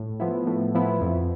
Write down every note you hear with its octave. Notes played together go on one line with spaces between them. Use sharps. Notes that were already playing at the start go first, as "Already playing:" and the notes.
Already playing: A2
F3 B3 E4
A2
F3 B3 E4
F2